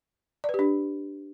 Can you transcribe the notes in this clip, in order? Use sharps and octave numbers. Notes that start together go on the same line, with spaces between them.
D5
B4
G4
D4